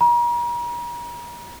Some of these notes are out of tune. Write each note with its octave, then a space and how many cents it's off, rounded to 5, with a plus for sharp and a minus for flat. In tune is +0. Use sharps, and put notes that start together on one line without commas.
A#5 +40